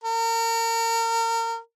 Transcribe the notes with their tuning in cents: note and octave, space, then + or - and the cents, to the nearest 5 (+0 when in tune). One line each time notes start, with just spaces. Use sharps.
A#4 -30